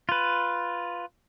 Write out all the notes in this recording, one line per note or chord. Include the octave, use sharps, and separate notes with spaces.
F4 B4